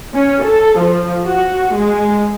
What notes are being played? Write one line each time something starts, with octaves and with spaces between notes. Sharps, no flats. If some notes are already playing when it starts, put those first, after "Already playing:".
C#4
A4
F3
F#4
G#3